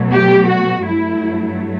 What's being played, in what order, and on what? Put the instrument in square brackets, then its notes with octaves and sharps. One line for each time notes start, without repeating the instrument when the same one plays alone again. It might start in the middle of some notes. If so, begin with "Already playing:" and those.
Already playing: [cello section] B2 F#3 A3
G4
F#4
G2 F#3 A3 E4